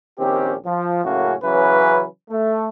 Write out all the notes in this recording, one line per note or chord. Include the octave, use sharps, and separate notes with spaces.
A#1 D#3 C4 C#4 G4
F3
F#2 A2 C#3 A#3 C#4 F#4
C#3 E3 F#3 C#4 B4
A3